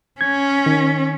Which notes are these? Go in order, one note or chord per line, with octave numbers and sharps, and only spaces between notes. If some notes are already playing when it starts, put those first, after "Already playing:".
C#4 G#6
D#3